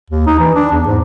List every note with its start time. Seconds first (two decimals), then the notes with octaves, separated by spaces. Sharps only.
0.10 D#2
0.27 D#4
0.39 E3
0.55 D4
0.72 E2
0.87 G#2